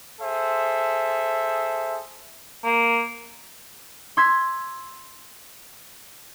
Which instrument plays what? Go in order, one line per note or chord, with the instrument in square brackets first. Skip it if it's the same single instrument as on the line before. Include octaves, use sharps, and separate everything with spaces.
[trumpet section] G#4 A4 C5 E5
[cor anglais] A#3
[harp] C6 E6 G#6 B6